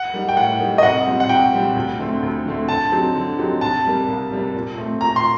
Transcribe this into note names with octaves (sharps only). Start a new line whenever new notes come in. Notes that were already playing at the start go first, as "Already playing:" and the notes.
Already playing: F#5
G3 A#3 D#4
G5
A2 F#5
G3 A#3 D#4
D#5
C2 F#5
A#2 G3 C4
F#5
C2 G5
A#2 G3 C4
D2
D3 A3 C4
D2
D3 A3 C4
D3 A5
F#3 C4 D#4 G4
D3
F#3 C4 D#4 G4
C2 A5
C3 G3 A#3
C2
C3 G3 A#3
A#2
A3 C4
A#2 A#5
C6